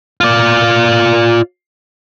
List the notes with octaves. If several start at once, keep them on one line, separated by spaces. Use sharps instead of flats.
F4 D5